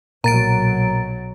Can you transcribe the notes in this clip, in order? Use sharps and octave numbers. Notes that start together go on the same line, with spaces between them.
B1 A#2 F#3 A#5 A6 D7